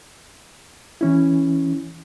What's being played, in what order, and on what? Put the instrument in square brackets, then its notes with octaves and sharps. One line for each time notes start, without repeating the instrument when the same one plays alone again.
[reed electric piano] E3 C#4 E4